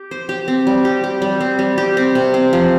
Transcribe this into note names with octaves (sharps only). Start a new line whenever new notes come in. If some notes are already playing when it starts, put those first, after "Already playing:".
Already playing: G4
C5
G4
C4
G3
G4
G4
G3
C4
G3
G4
C4
C3
C4
F3